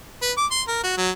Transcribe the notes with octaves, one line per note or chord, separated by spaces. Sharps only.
B4
D6
C6
A#4
F#4
F#3